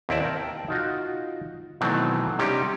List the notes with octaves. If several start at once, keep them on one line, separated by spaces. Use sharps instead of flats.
D#2 C4 E4 D5 A5
A#4 G5 A5
D#4 F4 F#4
B2 D#3 E3 F#3 A3 C4
C3 G3 C#4 D#4 G4